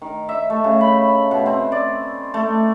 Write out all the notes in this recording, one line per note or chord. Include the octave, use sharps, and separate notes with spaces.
D#3
E5
A3
C#3
B5
B2
C4
D5
A3